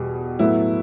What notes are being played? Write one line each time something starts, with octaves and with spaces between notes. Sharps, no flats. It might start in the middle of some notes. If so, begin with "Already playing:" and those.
Already playing: E2 B2 G3
A2 F#3 B3 E4